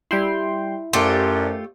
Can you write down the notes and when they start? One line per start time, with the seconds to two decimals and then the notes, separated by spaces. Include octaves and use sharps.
0.11 G3 E4 G5 C6
0.93 F#2 A3 F4 G4 C5 D5 A5